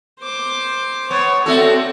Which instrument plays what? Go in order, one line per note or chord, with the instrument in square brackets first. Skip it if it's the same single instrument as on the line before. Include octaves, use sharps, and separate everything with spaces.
[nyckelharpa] C5 D6
[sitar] B3 [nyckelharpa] C#5
[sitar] A3 F#4 A4 [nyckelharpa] C4 D5